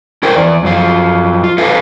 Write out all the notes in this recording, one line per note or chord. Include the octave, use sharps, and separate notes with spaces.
C#4 E4 A#4 C5 G5
E2 D5
F#2 F3 F4
F4
E4 G4 A4 B4 E5 F5